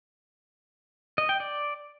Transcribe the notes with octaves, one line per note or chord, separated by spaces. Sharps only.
D#5
G5
D5